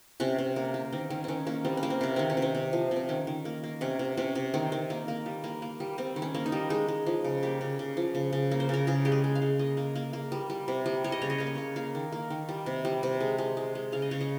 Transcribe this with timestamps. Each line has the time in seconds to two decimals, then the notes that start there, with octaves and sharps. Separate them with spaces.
0.20 C3 C#4
0.38 C3
0.56 A#3
0.74 A#3
0.92 D#3 C4
1.10 D#3 C#4
1.24 D#3 C4 C#4
1.47 A#3 C#4
1.65 G3 C4
1.77 C#4
1.83 A#3
1.90 C4
2.01 C3 C#4
2.16 D#3 C4
2.30 C#4
2.37 C3
2.42 C4
2.55 C3
2.73 F3
2.91 C3
2.96 C4
3.09 D#3 C#4
3.27 D#3
3.45 A#3
3.64 A#3
3.81 C3 C#4
3.99 C3
4.17 C3 C#4
4.35 C3
4.54 D#3 C4
4.72 D#3
4.90 A#3
5.08 A#3
5.26 G3
5.44 A#3
5.62 A#3
5.80 G3
5.98 G3 C4
6.16 D#3
6.22 C#4
6.34 A#3
6.46 D#4
6.52 G3
6.70 G#3 D#4
6.88 G#3
7.06 F3
7.24 C#3
7.43 A#3 G4
7.61 C#3
7.79 C#3
7.97 F3
8.15 C#3
8.33 C#3
8.51 A#3
8.60 C5
8.69 C#3 A#4
8.87 C#3 G#4
9.05 G#3 G4
9.12 G#4
9.24 G#3
9.35 F5
9.42 G#3
9.59 A#3 D#5
9.77 A#3
9.95 A#3
10.13 A#3
10.32 G3
10.50 G3
10.68 C3
10.86 G3
11.04 G3 C#5
11.12 D#5
11.22 C#3 C#5
11.30 D#5
11.38 A#3 C#5
11.47 D#5
11.55 C#3 C#5
11.76 A#3 F5
11.95 D#3
12.12 A#3
12.30 D#3
12.49 G3
12.66 C3
12.85 G3
13.03 C3
13.20 G#3
13.38 G#3
13.57 G#3
13.75 G#3
13.92 C#3 F5
14.02 D#5
14.11 C#3 C#5
14.21 D#5